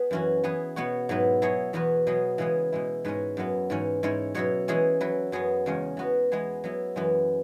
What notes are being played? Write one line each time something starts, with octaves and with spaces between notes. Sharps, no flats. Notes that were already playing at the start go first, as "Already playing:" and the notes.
Already playing: B3 G#4 B4
F#2 E3 C#4 F#4
E3 B3 G#4 B4
B2 B3 F#4 C#5
G#2 F#3 B3 E4 B4
F#3 E4 G#4 C#5
E2 E3 B3 F#4 B4
B2 F#3 B3 G#4
C#3 E3 G#3 B3 G#4
B2 G#3 E4
G#2 G#3 C#4 G#4 B4
F#2 F#3 B3 E4
G#2 E3 C#4
G#2 G#3 C#4 E4 C#5
B2 F#3 E4 C#5
E3 G#3 C#4 G#4
F#3 E4 B4
F#2 F#3 B3 G#4
E2 C#3 G#3 C#4
E3 B3 F#4 B4
E3 G#3 B3 G#4
F#3 B3 E4
F#2 E3 G#3 B3